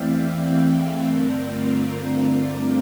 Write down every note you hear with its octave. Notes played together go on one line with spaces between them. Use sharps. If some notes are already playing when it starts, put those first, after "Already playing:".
Already playing: E2 E3 A3 C4 D5 E5 F5 G5
E5 G5
D5 F5
G2 D3 A3 C4 A#4 D5
F4
F4